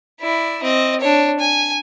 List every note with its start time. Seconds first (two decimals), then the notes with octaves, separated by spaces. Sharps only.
0.20 E4 D5
0.63 C4 D#5
1.00 D4 C#5
1.39 G#5